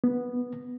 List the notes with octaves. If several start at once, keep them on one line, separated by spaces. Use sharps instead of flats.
B3